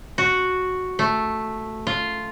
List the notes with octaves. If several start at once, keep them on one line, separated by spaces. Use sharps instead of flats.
F#4
A3
F4